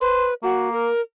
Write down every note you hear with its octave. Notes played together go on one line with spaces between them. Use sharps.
B4 C5
A#3 F#4
A#4